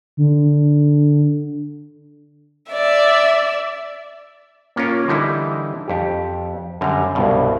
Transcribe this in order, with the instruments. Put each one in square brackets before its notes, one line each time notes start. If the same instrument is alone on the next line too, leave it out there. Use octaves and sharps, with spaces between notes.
[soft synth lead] D3
[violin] D5 E5
[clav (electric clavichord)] A#3 C#4 F4 A#4 C#5
D3 E3 G3 D#4 E4
F2 G4
F#2 D3 G3 A#5
C2 G2 B2